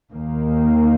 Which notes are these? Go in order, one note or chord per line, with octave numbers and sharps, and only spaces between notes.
D#2 D#3 A#3